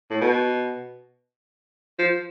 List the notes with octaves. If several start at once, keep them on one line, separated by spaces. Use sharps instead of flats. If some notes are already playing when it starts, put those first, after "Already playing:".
A2
B2
F3